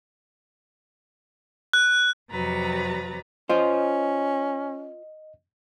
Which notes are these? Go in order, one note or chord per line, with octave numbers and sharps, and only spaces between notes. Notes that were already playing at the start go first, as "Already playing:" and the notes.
F#6
F2 C3 F#3 B4 A#5 A6
C#4 F4 C5 D#5